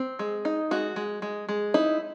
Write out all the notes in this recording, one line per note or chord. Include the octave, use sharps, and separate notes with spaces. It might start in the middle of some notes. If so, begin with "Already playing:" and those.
Already playing: C4
G#3
D#4
G#3 F#4
G#3
G#3
G#3
D#4 E4